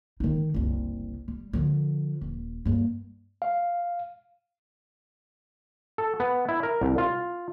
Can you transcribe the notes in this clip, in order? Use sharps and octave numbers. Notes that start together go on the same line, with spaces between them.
D#3 D#4
F#1 C2
G3
D3 F3
D#1
G2 A#3
F5
A4
B3
E4
A#4
C2
F4